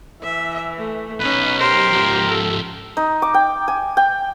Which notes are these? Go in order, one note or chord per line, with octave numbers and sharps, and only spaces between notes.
E3 E5
A3
B1 C#4 D#4 B4
G4 A#4 C5
G#2 F3
A4
D#4
D6
G5
G#5
G5